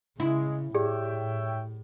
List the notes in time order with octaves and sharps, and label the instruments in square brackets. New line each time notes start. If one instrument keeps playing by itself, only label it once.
[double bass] C#3 [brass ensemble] G#3 [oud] E4
[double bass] A2 [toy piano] G4 G#4 D5 [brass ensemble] C#5 E5 G5